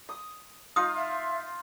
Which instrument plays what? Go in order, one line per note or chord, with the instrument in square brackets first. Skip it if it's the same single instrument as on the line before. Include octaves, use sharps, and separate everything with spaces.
[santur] D#6
[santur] D#4 F4 F5 [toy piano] D#6
[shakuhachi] E5